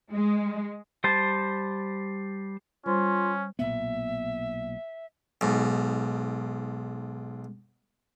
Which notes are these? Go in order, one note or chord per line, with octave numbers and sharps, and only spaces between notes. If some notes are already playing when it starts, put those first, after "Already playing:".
G#3
G3 C5 A5
G3 C#4 F4 C5
B1 A#2 B3 E5
B1 G#2